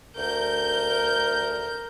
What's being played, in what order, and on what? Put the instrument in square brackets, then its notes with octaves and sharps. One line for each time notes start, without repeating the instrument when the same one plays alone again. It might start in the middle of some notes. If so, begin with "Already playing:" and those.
[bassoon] D2 [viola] A#4 [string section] G6